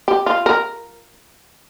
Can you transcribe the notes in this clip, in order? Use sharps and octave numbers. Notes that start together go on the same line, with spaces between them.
G4
F4
A#4